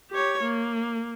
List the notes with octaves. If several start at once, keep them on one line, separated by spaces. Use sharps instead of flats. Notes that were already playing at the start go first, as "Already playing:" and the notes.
G4 C#5
A#3